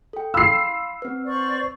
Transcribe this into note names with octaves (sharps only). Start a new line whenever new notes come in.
A4 G5
F5 B5 C6 E6 C7
C4 B4
C5 D5 C#6